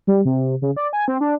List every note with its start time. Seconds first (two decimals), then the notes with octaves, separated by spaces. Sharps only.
0.07 G3
0.25 C3
0.62 C#3
0.77 D5
0.93 G#5
1.08 C4
1.21 D4